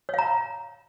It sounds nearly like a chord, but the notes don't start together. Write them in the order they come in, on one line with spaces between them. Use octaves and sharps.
C#5 F5 A#5